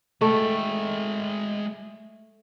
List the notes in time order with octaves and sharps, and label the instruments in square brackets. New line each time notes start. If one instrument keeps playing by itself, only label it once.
[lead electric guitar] G#3 G5 [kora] A3